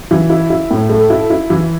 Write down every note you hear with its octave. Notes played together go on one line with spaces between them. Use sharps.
E3
E4
E4
A2
A3
E4
E4
E3